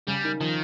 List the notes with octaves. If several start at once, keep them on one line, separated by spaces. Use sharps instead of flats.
C#3 G3
D#3
D#3 F3